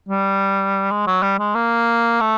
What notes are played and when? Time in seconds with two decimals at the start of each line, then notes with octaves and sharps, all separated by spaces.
0.09 G3
0.91 G#3
1.07 F#3
1.23 G3
1.39 G#3
1.55 A#3
2.21 A3